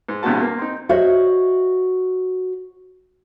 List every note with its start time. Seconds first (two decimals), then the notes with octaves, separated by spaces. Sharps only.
0.09 G#2
0.23 E2 G2 A#2 C4 F#4 A5
0.41 A#3
0.58 C4 D#4
0.89 F#4 C5 C#5 D#5 E5